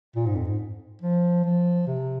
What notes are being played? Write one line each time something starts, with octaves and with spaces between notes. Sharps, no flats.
A#2
G#2
F2
G#2
F3
F3
C3